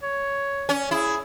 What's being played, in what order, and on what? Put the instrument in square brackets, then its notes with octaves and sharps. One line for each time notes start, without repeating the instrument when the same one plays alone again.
[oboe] C#5
[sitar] C#4
[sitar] E4 [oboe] G#4